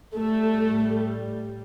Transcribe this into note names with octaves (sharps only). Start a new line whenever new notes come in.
A2 G3 A3